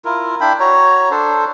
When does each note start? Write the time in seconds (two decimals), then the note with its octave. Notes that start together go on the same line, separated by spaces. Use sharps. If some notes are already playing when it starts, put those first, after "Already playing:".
0.05 E4 F4 A#4
0.40 D4 E4 G5 B5
0.60 F#4 C#5 A#5
1.11 D4 A4 C5